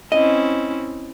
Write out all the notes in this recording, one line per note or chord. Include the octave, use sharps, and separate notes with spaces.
C4 C#4 E4 D#5